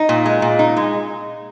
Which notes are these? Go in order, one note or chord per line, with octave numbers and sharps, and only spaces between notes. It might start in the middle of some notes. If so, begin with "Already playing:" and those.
Already playing: D#4
A#2
G#3
A#2
D#4
G#3